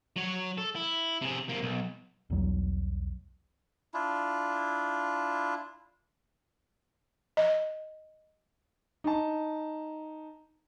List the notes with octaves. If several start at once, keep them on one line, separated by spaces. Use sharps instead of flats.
F#3 C#5
A4
E4
C3 G#4
C3 A#3
B1
B1 E2 F#3 G3
D4 E4 F4
D#5
D#4 A5